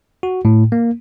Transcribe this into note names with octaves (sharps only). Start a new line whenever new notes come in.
F#4
A2
A#3